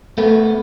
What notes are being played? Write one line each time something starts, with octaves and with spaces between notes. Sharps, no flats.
A3 B3